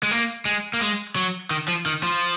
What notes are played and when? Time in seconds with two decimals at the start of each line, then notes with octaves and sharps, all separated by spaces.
0.03 G#3
0.11 A#3
0.45 G#3
0.74 A#3
0.81 G#3
1.16 F#3
1.51 D#3
1.68 F3
1.86 D#3
2.03 F3